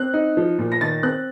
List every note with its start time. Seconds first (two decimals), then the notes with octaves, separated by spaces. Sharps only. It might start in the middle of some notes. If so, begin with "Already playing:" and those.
Already playing: C4 F#6
0.14 D#4
0.37 F3
0.59 A#2
0.72 A#6
0.81 D#3 A6
1.03 C4 F#6